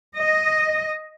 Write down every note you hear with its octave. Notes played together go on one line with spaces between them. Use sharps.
D#5